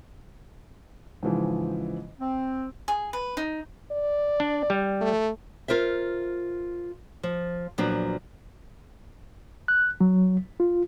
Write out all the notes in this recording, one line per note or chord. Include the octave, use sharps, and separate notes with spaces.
G#2 C#3 E3 F3
C4
G#4
B4
D#4
D5
D4
G3
A3
F4 A#4 C5 E5
F3
A#2 F3 F#3 B3 D4
F#6
F#3
F4